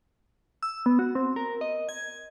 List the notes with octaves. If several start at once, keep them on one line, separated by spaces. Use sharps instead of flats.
E6
B3
F#4
C4
A#4
D#5
G#6